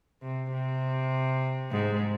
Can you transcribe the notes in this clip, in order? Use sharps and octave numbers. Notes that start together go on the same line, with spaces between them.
C3
C3
G#2